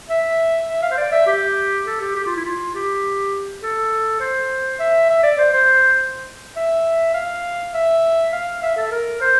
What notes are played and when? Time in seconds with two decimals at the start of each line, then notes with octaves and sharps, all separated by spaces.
0.10 E5
0.69 E5
0.82 F5
0.92 C5
0.98 D5
1.12 E5
1.27 G4
1.86 A4
2.01 G4
2.16 G4
2.26 F4
2.36 E4
2.45 F4
2.75 G4
3.63 A4
4.21 C5
4.79 E5
5.10 E5
5.23 D5
5.38 C5
5.53 C5
6.56 E5
7.14 F5
7.74 E5
8.32 F5
8.62 E5
8.77 A4
8.91 A#4
9.21 C5